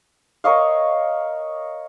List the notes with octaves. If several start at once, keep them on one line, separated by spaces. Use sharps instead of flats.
A#4 C#5 D#5 F5